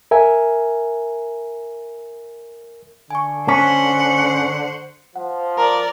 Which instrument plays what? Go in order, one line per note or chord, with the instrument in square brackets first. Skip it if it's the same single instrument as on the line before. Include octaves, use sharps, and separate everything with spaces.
[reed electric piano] A#4 E5 G#5
[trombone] D3 [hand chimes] G#5 C#6
[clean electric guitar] C#4 [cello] C5 F#5 [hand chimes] C#6 B6
[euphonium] F3 [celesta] F#5
[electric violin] A#4 D5 [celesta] A#5